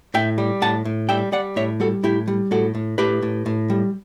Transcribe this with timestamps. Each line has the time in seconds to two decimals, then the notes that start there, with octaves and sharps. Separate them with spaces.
0.14 A2 E5 G5
0.38 G3
0.62 A2 F#5 A5
0.85 A2
1.09 G3 E5 G5
1.32 G3 D5 F#5
1.56 A2 C#5 E5
1.80 G3 F#4 A4
2.03 A2 E4 G4
2.28 G3
2.51 A2 F#4 A4
2.75 A2
2.98 A2 G4 B4
3.22 A2
3.46 A2
3.70 G3